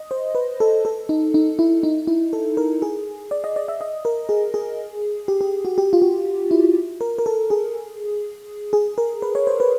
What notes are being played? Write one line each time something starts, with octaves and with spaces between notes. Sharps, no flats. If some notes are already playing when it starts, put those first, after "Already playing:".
Already playing: D#5
C5
B4
A4
A4
D#4
D#4
E4
D#4
E4
A4
A#4
G#4
D5
D#5
D5
E5
D#5
A#4
G#4
G#4
G4
G4
F#4
G4
F4
F#4
E4
A#4
A#4
A4
G#4
G#4
A#4
B4
C#5
C5
B4